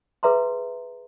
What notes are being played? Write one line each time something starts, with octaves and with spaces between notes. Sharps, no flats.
G#4 B4 E5 A#5 C6